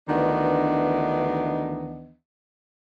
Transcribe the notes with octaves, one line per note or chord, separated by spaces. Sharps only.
D2 D#3 E3 B3 D4 D#5